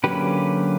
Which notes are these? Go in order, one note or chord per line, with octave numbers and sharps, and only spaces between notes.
D3 F#3 A#3 C#4 G4 B4